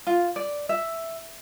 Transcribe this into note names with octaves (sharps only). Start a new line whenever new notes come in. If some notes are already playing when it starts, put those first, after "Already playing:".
F4
D5
E5